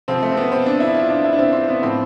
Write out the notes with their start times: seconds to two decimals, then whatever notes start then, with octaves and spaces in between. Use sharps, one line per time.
0.08 C3 F3 C4
0.23 A3
0.32 C4
0.37 B3
0.52 C4
0.66 D4
0.80 E4
0.95 F4
1.10 D4
1.24 E4
1.33 D4
1.38 C4
1.53 C4
1.68 B3
1.82 A2 F3 C4